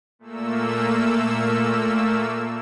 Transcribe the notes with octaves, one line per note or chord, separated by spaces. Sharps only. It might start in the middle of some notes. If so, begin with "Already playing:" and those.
A#2 A3 A#3 E6